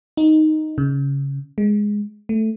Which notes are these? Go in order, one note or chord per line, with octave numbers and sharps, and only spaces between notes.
D#4
C#3
G#3
A3